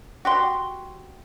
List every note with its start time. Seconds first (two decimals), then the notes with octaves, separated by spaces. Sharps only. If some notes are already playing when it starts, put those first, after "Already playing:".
0.25 F#4 G4 C6